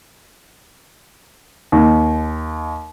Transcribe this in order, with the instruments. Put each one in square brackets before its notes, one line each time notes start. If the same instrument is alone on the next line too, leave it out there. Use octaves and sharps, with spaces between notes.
[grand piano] D#2